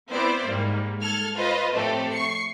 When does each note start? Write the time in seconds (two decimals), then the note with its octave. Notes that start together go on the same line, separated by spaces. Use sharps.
0.10 B3 C4 E4 C5 D5
0.45 G#2 G3 A#3
1.02 A4 F6 G#6
1.37 F4 B4 C5 D#5
1.74 A2 F3 A3 C4 G4 A4
2.12 C#6 C7 C#7